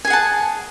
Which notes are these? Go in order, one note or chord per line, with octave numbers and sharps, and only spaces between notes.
G#4 F#5 G#5 A5